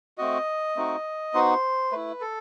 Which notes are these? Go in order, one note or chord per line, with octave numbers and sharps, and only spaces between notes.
A3 C4 F#4 D#5
A3 C4 D#4 F#4
B3 D#4 F#4 C5
A3 E4 B4
A4